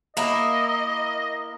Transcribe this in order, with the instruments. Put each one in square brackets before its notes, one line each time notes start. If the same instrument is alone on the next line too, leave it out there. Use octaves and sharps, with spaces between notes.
[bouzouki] A#3 E4 [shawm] D#5